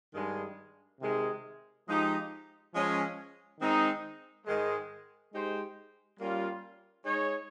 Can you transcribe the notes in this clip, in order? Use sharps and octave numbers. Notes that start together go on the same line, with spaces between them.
G2 D#3 G#3
C3 D#3 G#3
F3 G#3 D#4 G4
F3 G#3 C#4
D#3 G#3 C4 D#4
G#2 D#3 G#3
G#3 D#4 G4 C5
G3 A#3 C#4 F4
G#3 D#4 G#4 C#5